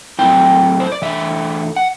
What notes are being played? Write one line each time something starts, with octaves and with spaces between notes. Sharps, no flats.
F#3 A3 C4 E4 G5
C5
D5
E3 A3 D4 E5
F#5